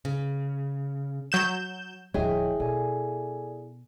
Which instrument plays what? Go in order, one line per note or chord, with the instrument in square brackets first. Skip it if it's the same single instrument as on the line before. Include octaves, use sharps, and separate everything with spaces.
[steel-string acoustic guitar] C#3
[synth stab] F#3 G6 E7
[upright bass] D1 F3 [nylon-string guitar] E4 G#4 [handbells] C#5 D#5 G5
[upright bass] B2 [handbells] A4 D5 G#5